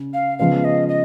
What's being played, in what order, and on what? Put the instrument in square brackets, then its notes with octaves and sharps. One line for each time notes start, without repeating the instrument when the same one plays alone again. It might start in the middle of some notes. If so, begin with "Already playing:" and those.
Already playing: [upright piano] C#3
[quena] F5
[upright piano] C#3 F3 G#3 B3 [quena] F5
[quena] D#5
D#5